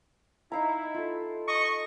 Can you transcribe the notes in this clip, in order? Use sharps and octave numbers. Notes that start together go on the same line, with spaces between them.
D#4 E4 F5 A#5
F4 A4
D#5 C#6